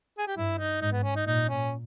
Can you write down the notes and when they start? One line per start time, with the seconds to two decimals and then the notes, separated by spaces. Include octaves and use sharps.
0.18 G#4
0.27 G4
0.37 G2 E4
0.59 D#4
0.81 G#2 D#4
0.92 B3
1.03 C#4
1.16 D#4
1.26 A#2 D#4
1.49 C#4